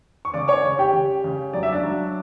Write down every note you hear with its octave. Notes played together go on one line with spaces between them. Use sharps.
C#6
C#3 D5 D6
C#5 C#6
C#3
G4 G5
C#3
C#3
F#3 D5
E5
D4 D5
F#3